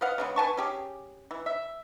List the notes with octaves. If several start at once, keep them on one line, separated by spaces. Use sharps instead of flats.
B4 D#5 F5 F#5
C#3 G#3 B3
B4 G#5 A5 C#6
C#4 G4 G#4
E3
E5